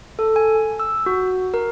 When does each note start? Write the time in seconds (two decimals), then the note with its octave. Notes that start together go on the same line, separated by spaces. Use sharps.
0.19 A4
0.36 G#5
0.80 E6
1.06 F#4
1.54 A#4